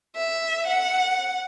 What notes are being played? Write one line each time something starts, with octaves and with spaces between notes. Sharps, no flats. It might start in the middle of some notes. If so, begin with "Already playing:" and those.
E5
F#5